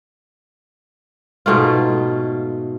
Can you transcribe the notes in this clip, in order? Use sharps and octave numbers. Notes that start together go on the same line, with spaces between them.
G#2 B2 A3 F4